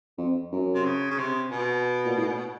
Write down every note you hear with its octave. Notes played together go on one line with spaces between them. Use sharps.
F2
F#2
C3
C#3
C#3
C3
B2
A#2
A2